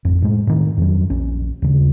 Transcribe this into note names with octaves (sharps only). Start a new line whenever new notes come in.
A1 F2
A2 G#3
A2 D#3
F2 F#3
A#1 C#4
D#2 C#3